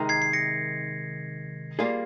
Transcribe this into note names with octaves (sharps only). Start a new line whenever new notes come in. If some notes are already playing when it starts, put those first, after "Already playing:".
Already playing: C3 D#3 G#3 D#4 A#4
G#6 C7
C7
A#6 C#7
G3 A#3 F4 G#4